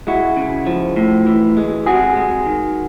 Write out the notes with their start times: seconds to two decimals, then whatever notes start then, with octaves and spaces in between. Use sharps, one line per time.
0.07 G#3 E4 F#4
0.37 C#3
0.67 F3
0.96 A2
1.26 E3
1.57 G#3
1.86 C3 F#4 G#4
2.16 G#3
2.46 D#3